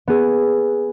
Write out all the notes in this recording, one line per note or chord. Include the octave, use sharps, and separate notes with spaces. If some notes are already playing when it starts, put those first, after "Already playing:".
B3 G#4